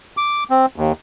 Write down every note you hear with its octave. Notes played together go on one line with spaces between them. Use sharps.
D6
C4
D#2